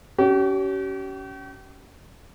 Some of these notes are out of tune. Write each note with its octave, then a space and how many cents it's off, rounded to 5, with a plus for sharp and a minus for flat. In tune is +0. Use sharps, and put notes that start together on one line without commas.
C#4 +25 G4 -40